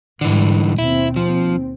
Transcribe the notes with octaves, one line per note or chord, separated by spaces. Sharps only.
G#2 D3 E3 G3
D#2 B2 C4 E4
F3